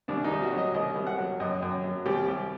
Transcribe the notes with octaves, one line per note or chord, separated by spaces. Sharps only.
C2 D4
D#4
C2
F#4
F#3 D#5
C2 D#5
C2
F#5
F#3
F#2 D#5
F#2
F#3
C2 G4
C2